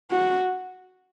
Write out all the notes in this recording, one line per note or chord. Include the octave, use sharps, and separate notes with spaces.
F#4